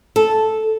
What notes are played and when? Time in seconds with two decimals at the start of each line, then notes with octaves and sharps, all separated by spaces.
0.16 A4